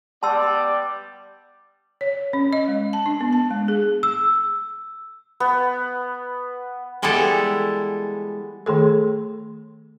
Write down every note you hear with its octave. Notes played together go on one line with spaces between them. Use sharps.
G3 B3 D5 A5 C6 E6
C#5
C#4
D#5
G#3
A5
D4
B3
A5
G#3
G#4
E6
B3
E3 G3 G#3 B3 E4 A4
D#3 A3 G#4 A4